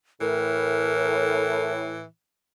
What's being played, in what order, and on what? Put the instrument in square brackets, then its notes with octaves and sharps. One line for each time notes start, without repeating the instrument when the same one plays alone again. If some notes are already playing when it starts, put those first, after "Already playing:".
[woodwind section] A2 [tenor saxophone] E3 [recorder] A#4